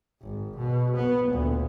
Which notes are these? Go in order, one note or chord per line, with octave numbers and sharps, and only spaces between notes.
G#1
B2
B3
D2 A#2